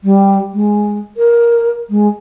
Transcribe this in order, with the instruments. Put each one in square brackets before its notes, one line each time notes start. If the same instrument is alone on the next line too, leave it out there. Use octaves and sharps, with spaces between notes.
[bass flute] G3
G#3
A#4
G#3